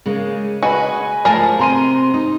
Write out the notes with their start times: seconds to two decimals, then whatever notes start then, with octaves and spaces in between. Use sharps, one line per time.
0.06 C#3 G#3 A#3
0.63 F#4 B4 D#5 G#5
1.25 F3 A3 G#4 A#4 A5
1.59 C3 C4 A#5 C6 D#7
2.14 D#4